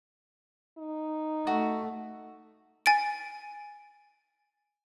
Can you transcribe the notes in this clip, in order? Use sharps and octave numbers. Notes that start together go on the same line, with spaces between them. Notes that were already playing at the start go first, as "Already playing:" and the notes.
D#4
A3 F#4
G#5 A6 D7